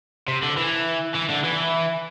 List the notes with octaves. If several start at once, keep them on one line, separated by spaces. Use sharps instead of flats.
C3
D3
E3
E3
D3
E3